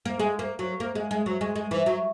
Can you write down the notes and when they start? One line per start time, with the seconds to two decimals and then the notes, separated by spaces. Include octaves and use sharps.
0.05 A#3
0.19 G#3
0.39 A#3
0.59 F#3
0.80 A#3
0.95 G#3
1.11 G#3
1.26 F#3
1.41 G#3
1.56 G#3
1.71 E3
1.86 F#3